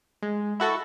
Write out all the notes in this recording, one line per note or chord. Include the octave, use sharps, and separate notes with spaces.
G#3
E4 F#4 A4